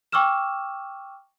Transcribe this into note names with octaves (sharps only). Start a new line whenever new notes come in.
G5 C#6 D6 E6 F6 E7